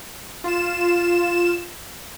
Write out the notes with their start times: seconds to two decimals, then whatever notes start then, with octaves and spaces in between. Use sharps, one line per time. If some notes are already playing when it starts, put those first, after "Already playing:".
0.44 F4 E7